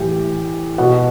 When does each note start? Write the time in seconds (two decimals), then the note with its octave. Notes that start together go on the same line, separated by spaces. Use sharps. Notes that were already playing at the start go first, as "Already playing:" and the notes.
Already playing: A2 E3 G4
0.78 B2 F#4 F#5